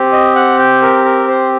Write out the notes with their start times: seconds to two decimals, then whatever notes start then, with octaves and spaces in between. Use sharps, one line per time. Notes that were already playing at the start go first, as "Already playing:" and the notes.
Already playing: C4 G4
0.12 D#5
0.36 F#5
0.59 G5
0.82 A#4
1.05 A#4
1.28 C5